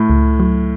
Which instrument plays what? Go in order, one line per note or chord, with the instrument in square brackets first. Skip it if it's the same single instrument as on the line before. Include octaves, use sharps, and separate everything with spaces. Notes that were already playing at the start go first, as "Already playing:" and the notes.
Already playing: [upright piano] A2
[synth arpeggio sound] C#2
F#3